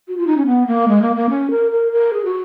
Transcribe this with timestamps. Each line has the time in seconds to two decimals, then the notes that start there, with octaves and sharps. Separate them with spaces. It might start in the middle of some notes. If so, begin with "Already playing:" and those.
0.08 F#4
0.17 F4
0.27 D#4
0.37 C#4
0.46 B3
0.67 A#3
0.88 G#3
1.02 A#3
1.16 A#3
1.30 C#4
1.51 A#4
1.72 A#4
1.92 A#4
2.13 G#4
2.25 F#4